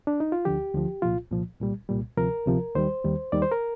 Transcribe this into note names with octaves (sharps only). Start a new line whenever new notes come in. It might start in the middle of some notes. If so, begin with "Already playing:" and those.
D4
D#4
F4
D2 D3 F3 G4
D2 D3 F3
C2 A#2 F3 F4
C2 A#2 F3
C2 A#2 G3
C2 A#2 G3
D2 C3 F3 A#4
D2 C3 F3
D#2 D#3 G3 C5
D#2 D#3 G3
D#2 D#3 G3 D5
C5
A#4